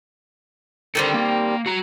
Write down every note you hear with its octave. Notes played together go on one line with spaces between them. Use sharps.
D3 D#3 G3 C4 A4
A#3
F#4 A#5